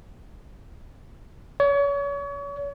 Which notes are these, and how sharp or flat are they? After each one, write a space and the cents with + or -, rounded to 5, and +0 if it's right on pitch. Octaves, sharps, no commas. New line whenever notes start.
C#5 +35